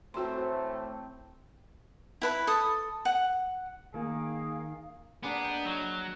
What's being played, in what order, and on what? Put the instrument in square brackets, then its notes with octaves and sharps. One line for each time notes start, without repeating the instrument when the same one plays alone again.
[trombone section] A2 E3 A3 [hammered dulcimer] C4 A#5 [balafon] F#4 C6
[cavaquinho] E4 B4 B5
A4 D#6
F#5
[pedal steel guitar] D#3 [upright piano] A#3 [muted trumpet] G#4 [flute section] F5
[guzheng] A#3 D4 G#4 [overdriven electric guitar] B3
[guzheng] D#5 G5
[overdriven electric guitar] F#3